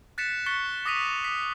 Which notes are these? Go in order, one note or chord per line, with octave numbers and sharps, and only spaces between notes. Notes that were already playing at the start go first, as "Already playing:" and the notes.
F#6 A6 B6 C#7 E7
C#6 F#6 A6 B6 C#7 G7
D6 D#6 A#6 B6 D#7 F7
D6 B6